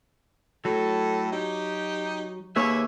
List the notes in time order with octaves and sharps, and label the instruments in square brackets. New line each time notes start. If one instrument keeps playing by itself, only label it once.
[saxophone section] A2 A4 [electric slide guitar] F#3
[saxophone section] D#4 G4
[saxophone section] D#2 C#5 E5 [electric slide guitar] A#3 G#4 B4